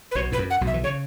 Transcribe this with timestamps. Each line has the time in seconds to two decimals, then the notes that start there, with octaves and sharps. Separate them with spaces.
0.11 B4
0.15 B1 B2 C#5
0.32 A2 B4
0.38 F#2
0.50 F#5
0.61 B1 B2
0.67 E5
0.74 E3
0.84 C#3 C#5